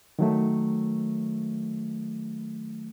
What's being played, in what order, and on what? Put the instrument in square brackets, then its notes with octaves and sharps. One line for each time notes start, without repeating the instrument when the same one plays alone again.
[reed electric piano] D#3 F#3 A3